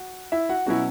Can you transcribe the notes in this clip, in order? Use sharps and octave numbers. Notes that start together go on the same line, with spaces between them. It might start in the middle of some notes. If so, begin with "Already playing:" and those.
Already playing: F#4 F#5
E4 E5
F#4 F#5
B2 F#3 C#4 E4 F#4 F#5